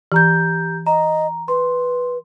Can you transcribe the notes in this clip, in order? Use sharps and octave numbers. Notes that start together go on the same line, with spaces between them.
E3 G4 A#5 G6
D#5 A#5
B4 C6